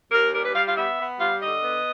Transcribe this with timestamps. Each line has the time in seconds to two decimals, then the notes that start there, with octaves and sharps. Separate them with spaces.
0.11 D#2 A#4
0.33 G3 A#4
0.44 B4
0.54 G3 F5
0.66 F5
0.76 B3 E5
0.98 B3
1.19 G3 F5
1.41 D3 D#5
1.64 B3